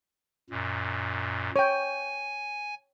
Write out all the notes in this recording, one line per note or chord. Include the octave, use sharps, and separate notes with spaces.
F#2 A#2
C#5 G5 G#5